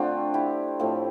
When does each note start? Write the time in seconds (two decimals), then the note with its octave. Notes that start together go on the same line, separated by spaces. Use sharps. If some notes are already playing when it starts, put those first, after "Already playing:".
Already playing: D3 A3 C4 D4 F4
0.34 E4 G4
0.80 A2 F3 A3 C4